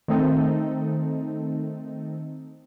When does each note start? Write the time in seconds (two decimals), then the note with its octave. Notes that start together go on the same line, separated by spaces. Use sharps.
0.08 D#3 A3 C4 D#4 A4